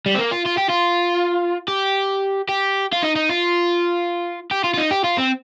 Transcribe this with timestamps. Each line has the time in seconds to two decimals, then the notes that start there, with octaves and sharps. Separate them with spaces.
0.06 G3
0.15 C4
0.19 A#3
0.32 F4
0.46 F4
0.58 G4
0.70 F4
1.68 G4
2.49 G4
2.92 F4
3.02 D#4
3.16 D#4
3.29 F4
4.51 G4
4.64 F4
4.74 F4
4.78 D#4
4.91 G4
5.04 F4
5.18 C4